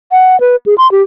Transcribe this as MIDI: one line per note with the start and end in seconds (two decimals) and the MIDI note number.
0.12 0.39 78
0.40 0.56 71
0.66 0.75 68
0.78 0.90 84
0.92 1.02 67